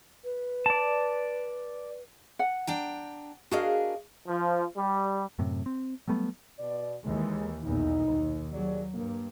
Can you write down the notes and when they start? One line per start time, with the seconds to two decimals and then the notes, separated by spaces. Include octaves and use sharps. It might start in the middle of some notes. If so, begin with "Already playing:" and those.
0.24 B4
0.66 D5 A5
2.39 F#5
2.67 D4 G5 A#5
3.51 D4 F#4 G#4 A#4 D#5 F5
4.28 F3
4.77 G3
5.39 F#2 A2 C3
5.66 C4
6.08 F#3 G3 A3 B3
6.59 B2 D5
7.05 D#2 E3 G#3
7.64 B1 E2 A#2 D#4
8.07 D#2
8.54 D#2 F#3 G#4 D5
8.94 G2 A#3